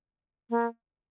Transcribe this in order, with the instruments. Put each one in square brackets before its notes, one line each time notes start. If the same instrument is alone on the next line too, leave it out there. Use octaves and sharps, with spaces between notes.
[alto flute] A#3